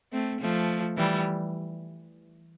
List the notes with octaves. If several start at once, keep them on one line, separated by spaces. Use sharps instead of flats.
A3 C4
F3 A3
E3 G3